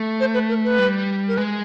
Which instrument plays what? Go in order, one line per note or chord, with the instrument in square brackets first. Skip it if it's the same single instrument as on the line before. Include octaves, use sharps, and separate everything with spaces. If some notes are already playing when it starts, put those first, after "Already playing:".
Already playing: [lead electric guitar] A3
[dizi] C5
B4
A#4
B4
[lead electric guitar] G3
[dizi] A#4
[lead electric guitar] G#3 [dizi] B4